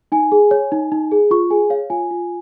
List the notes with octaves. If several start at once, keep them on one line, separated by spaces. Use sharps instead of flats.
D#4 G#5
G#4
C#5
D#4
D#4
G#4
F4 C#6
G#4 G#5
C#5 F5
F4 G#5
F4